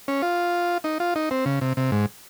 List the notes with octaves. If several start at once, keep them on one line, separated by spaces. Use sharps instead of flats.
C#4
F4
D#4
F4
D#4
C4
C#3
C3
C3
G#2